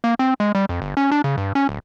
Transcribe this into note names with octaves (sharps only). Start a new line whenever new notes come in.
A#3
C4
G#3
G3
F2
G1
C#4
D4
C#3
G2
C#4
D1